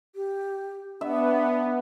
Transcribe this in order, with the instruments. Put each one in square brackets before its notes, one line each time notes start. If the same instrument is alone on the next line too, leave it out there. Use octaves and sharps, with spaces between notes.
[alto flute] G4
[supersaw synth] B3 [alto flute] D4 [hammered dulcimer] E5